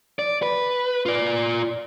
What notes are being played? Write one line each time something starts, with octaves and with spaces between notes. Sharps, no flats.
D5
B4
F4 D5